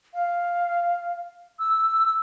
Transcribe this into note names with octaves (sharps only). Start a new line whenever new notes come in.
F5
E6